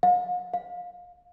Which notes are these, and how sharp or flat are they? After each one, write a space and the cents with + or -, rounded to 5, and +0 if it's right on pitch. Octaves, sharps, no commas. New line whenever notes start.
F5 +45
F5 +25